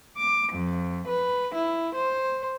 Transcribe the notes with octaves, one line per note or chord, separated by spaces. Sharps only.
D6
F2
B4
E4
C5